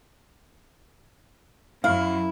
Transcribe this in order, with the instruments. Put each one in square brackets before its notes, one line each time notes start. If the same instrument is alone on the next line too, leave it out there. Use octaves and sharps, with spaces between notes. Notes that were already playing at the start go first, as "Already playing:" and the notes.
[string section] F#2 [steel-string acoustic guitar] E4 [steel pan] F5